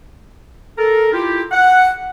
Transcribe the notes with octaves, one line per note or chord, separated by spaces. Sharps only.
A4 A#4
E4 F4 G4
F#5